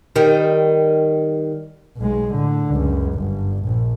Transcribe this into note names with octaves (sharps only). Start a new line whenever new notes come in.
D#3 G3
B1 G#3
A2 D3
C#2 F#2
G1
A#1